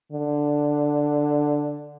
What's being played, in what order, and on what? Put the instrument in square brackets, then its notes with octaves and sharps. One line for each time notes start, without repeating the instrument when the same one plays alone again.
[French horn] D3